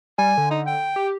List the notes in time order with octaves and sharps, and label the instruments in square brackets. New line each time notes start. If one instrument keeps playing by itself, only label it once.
[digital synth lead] G3 [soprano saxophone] G#5
[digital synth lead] D3
[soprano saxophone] D#4
G5
[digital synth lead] G4